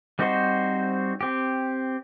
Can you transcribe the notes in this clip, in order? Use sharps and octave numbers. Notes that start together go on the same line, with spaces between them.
G3 C4 D#4 F#4 C5
C4 G4